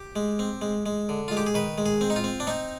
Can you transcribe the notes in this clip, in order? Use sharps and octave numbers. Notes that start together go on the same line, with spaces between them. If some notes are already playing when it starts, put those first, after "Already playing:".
Already playing: G4
G#3
C4
G#3
G#3
D3
G#3 F4
G4
G#4
D#3 B4
G#3
G#4
C4
D#4
F4
C4
D4
C4 D#4